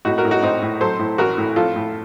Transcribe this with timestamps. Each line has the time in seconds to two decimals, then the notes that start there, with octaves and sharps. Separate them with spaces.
0.05 A2 D#4 F#4
0.18 F#4 A#4
0.25 A2
0.30 D#4 F#4
0.43 A2 C4 D#4
0.63 A2
0.81 F#3 A4 C5
0.99 A2
1.18 A1 F#4 A#4
1.38 A2
1.56 F3 F4 A4
1.76 A2